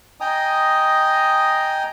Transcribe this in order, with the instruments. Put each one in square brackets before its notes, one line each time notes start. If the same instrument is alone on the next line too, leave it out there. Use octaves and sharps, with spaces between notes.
[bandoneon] D#5 G5 G#5 A#5 D#6